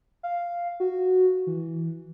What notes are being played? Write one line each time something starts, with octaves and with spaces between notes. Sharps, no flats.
F5
F#4
E3